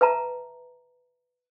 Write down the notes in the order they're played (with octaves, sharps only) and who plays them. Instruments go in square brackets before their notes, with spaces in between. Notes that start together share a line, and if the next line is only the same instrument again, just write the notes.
[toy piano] B4 E5 A5 A#5